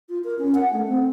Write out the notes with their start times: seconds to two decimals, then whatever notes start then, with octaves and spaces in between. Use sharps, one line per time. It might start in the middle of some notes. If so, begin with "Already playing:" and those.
0.09 F4
0.24 A#4
0.39 C#4
0.55 F#5
0.73 A3
0.88 C4